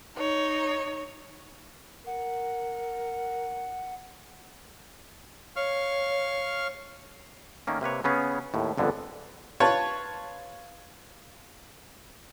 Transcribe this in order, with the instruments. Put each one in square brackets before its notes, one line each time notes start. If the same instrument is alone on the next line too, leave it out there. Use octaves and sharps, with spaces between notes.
[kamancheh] D#4 C#5
[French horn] A#4 [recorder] F#5
[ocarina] C#5 [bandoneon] F5 C#6 F6
[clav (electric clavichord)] D#3 A3 A#3 C#4
C3 A#3 B4 C#5
C#3 B3 C#4 G#4
D#2 A2
G1 F2 D3 G#3 B3
[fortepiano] F4 B4 C#5 A5